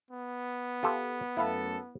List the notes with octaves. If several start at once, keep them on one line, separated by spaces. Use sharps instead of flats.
B3
F4 G4 A4
F#2 A3 E4 A4 B4 F5